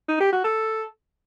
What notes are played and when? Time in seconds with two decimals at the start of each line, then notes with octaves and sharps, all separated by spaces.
0.09 D#4
0.20 G4
0.32 F#4
0.44 A4